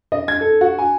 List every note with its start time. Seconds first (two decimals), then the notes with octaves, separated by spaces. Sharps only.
0.12 D#5
0.28 G#6
0.41 A4
0.61 F#4
0.78 G#5